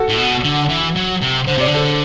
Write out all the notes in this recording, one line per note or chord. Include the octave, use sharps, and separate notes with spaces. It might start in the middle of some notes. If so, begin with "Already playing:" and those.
Already playing: F#4 A4
A2
B2
D3
E3
F#3
C3
D3 C5
C3 D5
D3
A4 C5